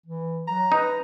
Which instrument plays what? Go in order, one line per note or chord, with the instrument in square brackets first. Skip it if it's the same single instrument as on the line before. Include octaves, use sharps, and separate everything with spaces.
[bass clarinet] E3
[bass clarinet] F#3 [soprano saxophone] A#5
[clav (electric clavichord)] D#4 [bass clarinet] B4